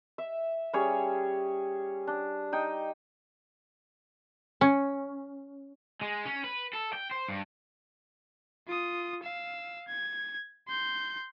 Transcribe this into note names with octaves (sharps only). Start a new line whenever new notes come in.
E5
G3 C#4 G#4 C#5
D4
D#4 G5 D#6
C#4
G#3
C#4
B4
A4
G5
C5
G2
F4 D#6
F5 E6
G#6
C6 G6